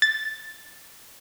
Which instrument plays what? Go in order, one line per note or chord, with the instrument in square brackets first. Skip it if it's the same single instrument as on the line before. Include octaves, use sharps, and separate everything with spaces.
[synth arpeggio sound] A6